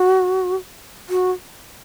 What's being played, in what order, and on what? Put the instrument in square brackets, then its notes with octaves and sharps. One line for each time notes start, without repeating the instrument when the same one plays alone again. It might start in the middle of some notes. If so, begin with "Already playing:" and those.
Already playing: [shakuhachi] F#4
F#4